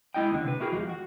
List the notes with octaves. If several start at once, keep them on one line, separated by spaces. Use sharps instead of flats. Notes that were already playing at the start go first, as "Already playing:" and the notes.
G#3 E4 D#5 G5
D#2 D3
C3 B4
E4 F#4 G#4 A#4 G5
E2 F3 G#3 G4
F#4